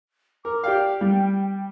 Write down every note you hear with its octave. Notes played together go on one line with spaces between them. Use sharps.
A#4 D6
G4 D5 F5 G5
G3